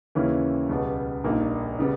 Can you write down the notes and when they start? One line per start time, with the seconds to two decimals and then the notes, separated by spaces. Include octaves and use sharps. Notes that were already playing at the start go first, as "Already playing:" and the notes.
0.15 D#2 C#3 E3 A#3 C#4
0.69 C#2 B2 G3 B3
1.24 A#1 A#2 G3 A#3 D#4
1.79 C#3 G3 B3